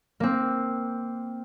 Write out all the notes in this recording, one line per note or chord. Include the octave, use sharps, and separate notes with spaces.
A#3 C4